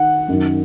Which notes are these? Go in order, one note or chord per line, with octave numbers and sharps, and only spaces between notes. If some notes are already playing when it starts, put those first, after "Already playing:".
Already playing: D#3 F#5
F#2 D#3